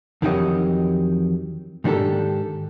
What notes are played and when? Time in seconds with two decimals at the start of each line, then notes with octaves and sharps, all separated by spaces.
0.22 F2 D#3 E3 F#3 G4 D#5
1.84 G#2 D#3 D4 F4 G4 A4